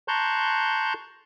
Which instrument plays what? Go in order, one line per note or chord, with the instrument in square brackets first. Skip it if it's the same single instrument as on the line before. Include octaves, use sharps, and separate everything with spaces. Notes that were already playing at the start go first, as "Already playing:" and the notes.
[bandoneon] A5 A#5 C6 C#6 F#6 G6